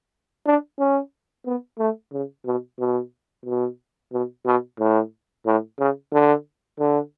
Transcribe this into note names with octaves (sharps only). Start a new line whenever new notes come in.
D4
C#4
B3
A3
C#3
B2
B2
B2
B2
B2
A2
A2
C#3
D3
D3